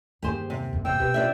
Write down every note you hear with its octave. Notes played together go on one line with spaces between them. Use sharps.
E2 G2 D#3 A#3 G4 G#4 C5
C3
F2
E2 G#2 C3 G5 E6
B2 G4 B4
F2 D4 E5